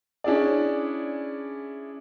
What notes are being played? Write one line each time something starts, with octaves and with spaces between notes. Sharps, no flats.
C#4 D4 E4 G#4 D5